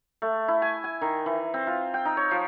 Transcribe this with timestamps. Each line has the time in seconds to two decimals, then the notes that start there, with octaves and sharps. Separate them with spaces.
0.22 A3
0.48 E4
0.62 G#5
0.84 G#5
1.01 D#3
1.26 E3
1.54 C4
1.67 F4
1.94 G5
2.05 D#4
2.17 C#5
2.31 F3